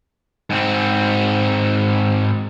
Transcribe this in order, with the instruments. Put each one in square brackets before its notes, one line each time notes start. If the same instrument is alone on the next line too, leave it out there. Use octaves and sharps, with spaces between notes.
[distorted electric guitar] G#2 C4